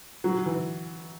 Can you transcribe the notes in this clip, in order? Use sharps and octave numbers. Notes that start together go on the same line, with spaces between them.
F#3
E3